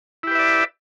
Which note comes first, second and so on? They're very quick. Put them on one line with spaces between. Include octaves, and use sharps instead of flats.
E4 G4 B4 E5 D5